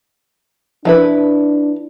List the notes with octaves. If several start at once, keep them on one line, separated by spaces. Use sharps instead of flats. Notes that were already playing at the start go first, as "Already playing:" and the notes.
F3 D4 E4 B4